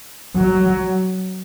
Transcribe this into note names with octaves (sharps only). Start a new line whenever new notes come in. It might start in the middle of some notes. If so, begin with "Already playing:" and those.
F#3